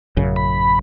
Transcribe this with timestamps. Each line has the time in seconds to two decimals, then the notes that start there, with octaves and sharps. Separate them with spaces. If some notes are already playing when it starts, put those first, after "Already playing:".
0.17 A1 F#2 C#3
0.36 B5